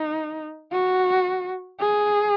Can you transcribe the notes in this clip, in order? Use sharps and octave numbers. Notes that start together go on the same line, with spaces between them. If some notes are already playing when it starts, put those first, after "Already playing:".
Already playing: D#4
F#4
G#4